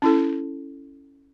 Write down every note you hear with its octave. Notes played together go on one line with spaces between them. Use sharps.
C#4 E4 A4